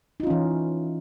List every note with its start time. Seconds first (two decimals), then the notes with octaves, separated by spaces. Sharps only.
0.20 D#4
0.23 F4
0.27 C#4
0.30 E3